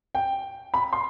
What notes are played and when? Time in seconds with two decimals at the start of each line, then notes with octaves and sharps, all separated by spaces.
0.15 G5
0.74 B5
0.93 C6